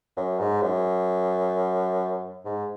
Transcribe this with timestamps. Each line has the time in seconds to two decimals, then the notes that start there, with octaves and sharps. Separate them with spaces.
0.17 F#2
0.39 G#2
0.62 F#2
2.45 G#2